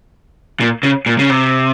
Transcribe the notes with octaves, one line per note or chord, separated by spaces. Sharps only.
A#2
C#3
A#2
C#3
C3